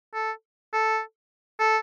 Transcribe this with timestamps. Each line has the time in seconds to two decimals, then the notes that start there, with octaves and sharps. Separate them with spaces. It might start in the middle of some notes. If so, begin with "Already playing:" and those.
0.14 A4
0.73 A4
1.60 A4